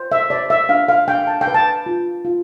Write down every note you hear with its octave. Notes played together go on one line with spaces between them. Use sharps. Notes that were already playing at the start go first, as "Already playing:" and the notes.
Already playing: C5
E5
C5 D5
E5
D4 F5
F5
D4 G5
A5
G5
B4
A5
F4
F4